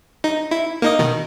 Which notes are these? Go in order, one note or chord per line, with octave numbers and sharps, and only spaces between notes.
D#4
E4
A#3 D#4 D#5
B2 D#3